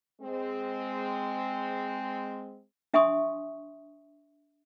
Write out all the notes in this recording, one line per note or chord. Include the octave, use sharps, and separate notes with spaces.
G#3 C4
D4 E5 G#5 C6 C#6 D#6